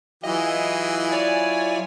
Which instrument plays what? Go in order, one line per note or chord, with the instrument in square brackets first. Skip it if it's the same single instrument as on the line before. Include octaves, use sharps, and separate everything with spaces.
[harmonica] E3 G#4 [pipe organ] F#3 E4 F4 [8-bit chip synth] D#5
[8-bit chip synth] C#5 D5 G#5